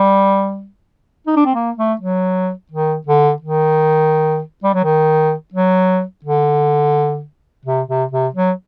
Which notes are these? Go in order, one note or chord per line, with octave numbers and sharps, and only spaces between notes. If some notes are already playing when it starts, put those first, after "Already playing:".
Already playing: G3
D#4
D4
C4
A#3
A3
F#3
D#3
D3
D#3
G3
F#3
D#3
F#3
D3
C3
C3
C3
F#3